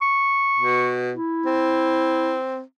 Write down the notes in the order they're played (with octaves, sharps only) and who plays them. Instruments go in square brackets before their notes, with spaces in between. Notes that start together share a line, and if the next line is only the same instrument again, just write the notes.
[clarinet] C#6
[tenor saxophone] B2
[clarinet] E4
[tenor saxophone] C4